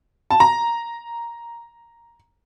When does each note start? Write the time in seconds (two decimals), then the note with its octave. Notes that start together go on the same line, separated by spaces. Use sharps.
0.30 A5
0.40 A#5